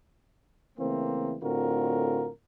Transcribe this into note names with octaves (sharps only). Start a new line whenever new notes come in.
C#3 E3 A3 A#3 C4
A2 D3 C4 F4 F#4 A#4